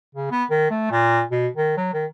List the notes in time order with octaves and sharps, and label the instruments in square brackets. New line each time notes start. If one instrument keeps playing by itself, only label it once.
[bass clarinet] C#3
B3
D#3
A3
A#2
B2
D#3
F#3
D#3